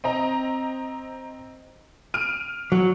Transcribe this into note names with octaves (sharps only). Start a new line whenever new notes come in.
C4 D#5 A#5
F6 D7 D#7
F#3